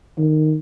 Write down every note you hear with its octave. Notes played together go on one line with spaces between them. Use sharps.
D#3